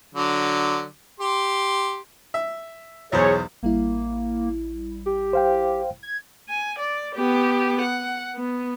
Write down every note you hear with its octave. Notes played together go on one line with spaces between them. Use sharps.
D3 F#3
G4 C6
E5
B1 E2 G#4 C5 C#5
A1 G3 A#3 E4
G4
C5 F5 G5
G#6
G#5
D5
B3 G4
F#5
B3